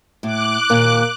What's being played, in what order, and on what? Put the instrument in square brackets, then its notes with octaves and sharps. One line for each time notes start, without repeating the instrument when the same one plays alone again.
[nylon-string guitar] A2 [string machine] D6 F#6
[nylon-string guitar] D#2 A#2 [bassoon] A#3